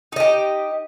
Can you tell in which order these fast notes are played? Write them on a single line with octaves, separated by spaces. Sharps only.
D#4 D#5 G4